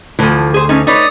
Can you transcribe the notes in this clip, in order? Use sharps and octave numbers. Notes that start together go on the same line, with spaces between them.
D2 E3 F3
G#4 C5
A3 C#4 D#4
D#4 B4 C#5 D5 D#6